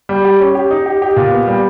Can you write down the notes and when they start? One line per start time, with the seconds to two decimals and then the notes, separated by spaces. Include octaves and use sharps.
0.09 G3
0.25 G4
0.40 C#4
0.55 G4
0.70 D#4
0.86 G4
1.02 G4
1.16 A#2
1.32 B3
1.47 G3